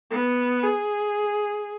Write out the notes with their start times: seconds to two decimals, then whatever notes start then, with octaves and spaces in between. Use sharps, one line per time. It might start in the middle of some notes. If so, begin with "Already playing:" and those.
0.10 B3
0.63 G#4